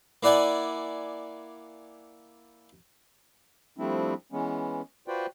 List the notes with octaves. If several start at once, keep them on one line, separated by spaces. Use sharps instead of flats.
A#3 E4 D5 F#5 G#5
F3 G3 A3 C4 D4 E4
E3 G#3 B3 C#4
F4 F#4 B4 C5 D5 G5